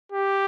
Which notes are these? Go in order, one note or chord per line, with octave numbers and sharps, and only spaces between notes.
G4